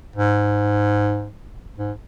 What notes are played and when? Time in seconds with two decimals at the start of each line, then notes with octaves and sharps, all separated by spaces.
0.16 G#2
1.78 G#2